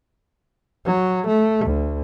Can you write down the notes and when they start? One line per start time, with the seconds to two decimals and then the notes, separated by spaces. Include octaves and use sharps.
0.86 F#3
1.28 A3
1.66 D2